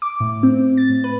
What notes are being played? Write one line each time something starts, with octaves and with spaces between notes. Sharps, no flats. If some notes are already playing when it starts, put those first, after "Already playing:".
D6
A2
C4
A6
A2
B4